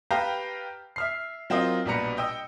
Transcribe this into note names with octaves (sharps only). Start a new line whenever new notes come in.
G4 B4 F5 G5 A5 A#5
E5 F6 C7
F#3 C4 F4 A#4 D#5
A#1 B2 G3 B4 A#5 C#7
D#5 G5 D#6 E6